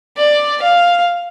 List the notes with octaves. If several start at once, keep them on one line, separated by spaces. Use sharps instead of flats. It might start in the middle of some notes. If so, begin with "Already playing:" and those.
D5
F5